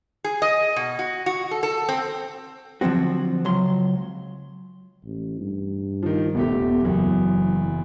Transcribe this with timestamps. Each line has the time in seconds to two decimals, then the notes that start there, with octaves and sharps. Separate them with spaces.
0.24 G#4
0.42 D#5
0.76 B2
0.99 F#4
1.26 F#4
1.51 A4
1.63 A4
1.89 C4
2.81 D3 F3 F#3 C4 F#4
3.45 C#2 F#3 C6
5.05 A1
5.40 G2
6.03 D#3 F3
6.35 D#1 A3 B3 G4
6.82 F#1 E2 F#3